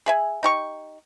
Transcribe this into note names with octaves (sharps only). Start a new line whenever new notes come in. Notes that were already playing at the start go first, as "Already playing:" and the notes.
G#4 E5 G#5
D#4 G4 C#6